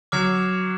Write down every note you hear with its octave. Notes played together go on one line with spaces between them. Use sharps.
F#3 D6 F6 G#6 C7 E7